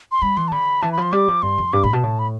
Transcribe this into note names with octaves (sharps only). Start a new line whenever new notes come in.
C6
G3 B5
E3 C6
A5
D3 B5
E3 A5
B5
F3 C6
G3 D6
F3
G2 C6
F2
G2 D6
A2 B5
B2 A5
A2
B5